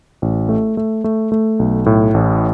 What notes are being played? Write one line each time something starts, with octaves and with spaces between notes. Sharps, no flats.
A1
A3
A3
A3
A3
B1
A2
A1